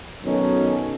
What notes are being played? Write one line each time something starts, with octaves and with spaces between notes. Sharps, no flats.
B2 D#3 F#3 C#4 D#4 A4